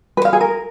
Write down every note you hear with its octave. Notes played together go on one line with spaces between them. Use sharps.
B4
F5
G#4
A#4